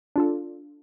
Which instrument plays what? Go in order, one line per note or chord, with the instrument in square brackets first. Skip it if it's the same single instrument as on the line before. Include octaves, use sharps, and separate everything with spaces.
[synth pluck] D4 F4 A4